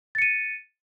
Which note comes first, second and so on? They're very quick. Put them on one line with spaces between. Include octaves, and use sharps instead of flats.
A6 C#7 D#7